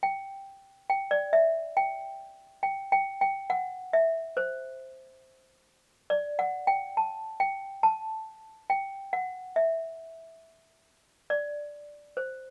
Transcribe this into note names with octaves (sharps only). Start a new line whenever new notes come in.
G5
G5
D5
E5
G5
G5
G5
G5
F#5
E5
C5
D5
F#5
G5
A5
G5
A5
G5
F#5
E5
D5
C5